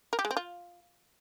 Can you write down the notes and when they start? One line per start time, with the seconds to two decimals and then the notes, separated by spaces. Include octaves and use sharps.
0.13 A#4
0.19 G4
0.25 G#3
0.31 C4
0.37 F4